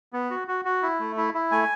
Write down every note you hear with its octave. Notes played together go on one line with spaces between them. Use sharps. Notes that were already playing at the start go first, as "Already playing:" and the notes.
B3
F#4
F#4
F#4
E4
A3
E4
E4
A3 G#5